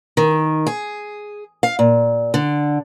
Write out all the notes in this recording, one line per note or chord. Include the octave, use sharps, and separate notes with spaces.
D#3
G#4
F5
A#2
D3